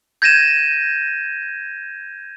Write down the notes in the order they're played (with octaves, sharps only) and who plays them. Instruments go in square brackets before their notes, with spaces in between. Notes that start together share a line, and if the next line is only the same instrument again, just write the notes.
[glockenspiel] G6 G#6 A#6 D#7 E7